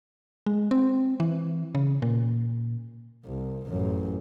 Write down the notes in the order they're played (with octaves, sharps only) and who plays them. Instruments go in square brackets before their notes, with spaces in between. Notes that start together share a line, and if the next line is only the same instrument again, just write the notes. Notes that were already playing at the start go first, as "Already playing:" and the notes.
[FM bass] G#3
C4
E3
C#3
A#2
[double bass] C2
A1 F#2